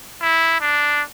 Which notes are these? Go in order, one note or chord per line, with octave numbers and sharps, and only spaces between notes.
E4
D4